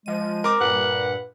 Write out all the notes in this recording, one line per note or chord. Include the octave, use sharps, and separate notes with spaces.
F3 G#3 D#7
C4 A#4 D6
G2 A#2 B4 F#5